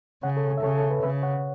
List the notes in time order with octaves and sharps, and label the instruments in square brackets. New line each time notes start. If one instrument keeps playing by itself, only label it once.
[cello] C#3 [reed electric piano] C#5 F#5
[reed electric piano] A4 C#5
E5
[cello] C#3 [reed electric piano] A4 C#5
[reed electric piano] A4
B4
[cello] C#3 [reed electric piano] B4 E5
[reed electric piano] C#5 F#5